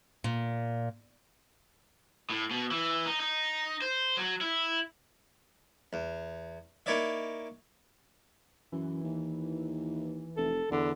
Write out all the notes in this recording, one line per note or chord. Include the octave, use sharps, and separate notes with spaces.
A#2
A2
B2
E3
D#4
D#4
C5
F#3
E4
E2
A#3 D#4 E4 C#5 D5 E5
F#2 E3
D#2
F1 A4
E2 D3